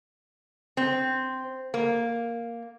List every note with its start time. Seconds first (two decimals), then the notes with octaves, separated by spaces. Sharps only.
0.77 C4
1.74 A#3